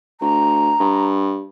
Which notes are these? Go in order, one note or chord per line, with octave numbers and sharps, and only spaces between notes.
D2 A#5
G2